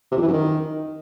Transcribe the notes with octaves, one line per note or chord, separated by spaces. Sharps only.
C3
F2
E3
F#2
D#3